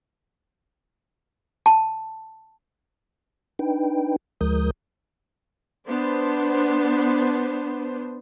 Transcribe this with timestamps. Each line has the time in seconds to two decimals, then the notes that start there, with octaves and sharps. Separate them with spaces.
1.66 A5
3.59 D4 D#4 B4 G5
4.41 D2 F3 G#3 A#4 D#6 G6
5.87 B3 D4 C5